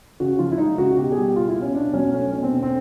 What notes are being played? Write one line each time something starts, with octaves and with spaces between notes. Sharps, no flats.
C#3 F#4
F3 F4
E4
G#3 D#4
C#3 F#4
B2 G4
G#4
G3 G4
A#3 F4
E4
B2
C#4
B2 D4
F#3 C#4
A3 C#4
B2 C#4
C4
D3
C4